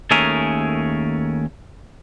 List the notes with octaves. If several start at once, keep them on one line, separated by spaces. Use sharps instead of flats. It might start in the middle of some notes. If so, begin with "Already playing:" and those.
D#2 A3 C#4 G#4 A#4